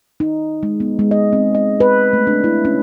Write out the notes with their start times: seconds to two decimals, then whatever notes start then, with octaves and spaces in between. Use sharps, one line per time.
0.20 D#4
0.63 G#3
0.80 B3
0.99 G#3
1.11 D#5
1.33 C4
1.55 D#5
1.80 B4
2.13 A3
2.27 D4
2.44 E4
2.65 C#4